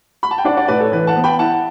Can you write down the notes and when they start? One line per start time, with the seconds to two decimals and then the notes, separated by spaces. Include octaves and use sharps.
0.23 B5
0.31 A5
0.38 G5
0.45 D4 D5 F#5
0.57 D5 F#5
0.68 A2 B4 D5
0.80 A4 C#5
0.92 E3 B4
1.07 F#5 A5
1.16 B3
1.24 G5 B5
1.39 E4 F#5 A5